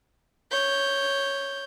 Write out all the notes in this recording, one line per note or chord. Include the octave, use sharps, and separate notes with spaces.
C#5 G6